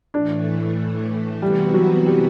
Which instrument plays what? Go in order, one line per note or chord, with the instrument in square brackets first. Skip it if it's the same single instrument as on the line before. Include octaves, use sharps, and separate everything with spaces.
[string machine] A2 E3 A3 [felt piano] D4
[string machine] C3 E3 B3 F#4 [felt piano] G3
[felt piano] F#3
G3